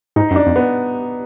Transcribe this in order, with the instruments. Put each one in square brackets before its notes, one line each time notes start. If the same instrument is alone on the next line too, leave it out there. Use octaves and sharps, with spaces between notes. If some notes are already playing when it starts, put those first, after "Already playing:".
[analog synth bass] G#2 [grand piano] D#4
[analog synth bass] F#2
[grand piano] D4
[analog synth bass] F2
[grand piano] B3